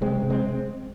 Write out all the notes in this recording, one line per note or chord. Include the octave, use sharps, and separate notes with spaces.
C3 G#3 C4
C3
G#3 C4